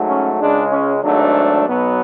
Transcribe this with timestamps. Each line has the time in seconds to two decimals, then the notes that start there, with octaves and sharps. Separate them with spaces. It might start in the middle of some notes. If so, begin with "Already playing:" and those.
Already playing: G#2 F#3 A3
0.09 C#4
0.40 C#2 C#3 G#3 D4
0.72 C#4
1.03 G#1 G#2 F#3 A3 D4
1.65 B1 B2 F#3 B3